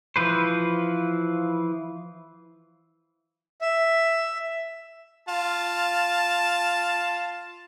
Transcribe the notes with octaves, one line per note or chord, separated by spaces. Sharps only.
E3 F3 B4 C5
E5
F4 A5